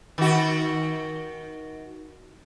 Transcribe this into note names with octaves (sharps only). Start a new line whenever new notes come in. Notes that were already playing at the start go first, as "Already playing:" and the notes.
D#3 F#4